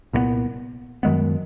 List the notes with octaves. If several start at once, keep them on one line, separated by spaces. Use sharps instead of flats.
C2 A#2 F#3 B3
F#2 D#3 G#3 B3